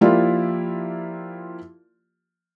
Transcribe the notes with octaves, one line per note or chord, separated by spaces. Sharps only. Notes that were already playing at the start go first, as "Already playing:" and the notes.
F3 A#3 E4 F4 G4 D5